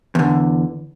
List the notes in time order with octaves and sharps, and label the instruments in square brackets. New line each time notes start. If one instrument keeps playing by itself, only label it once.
[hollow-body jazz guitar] E2 D3